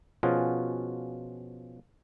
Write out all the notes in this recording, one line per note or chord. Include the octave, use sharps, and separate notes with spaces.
B2 F3 C#4 F4 F#4 G#4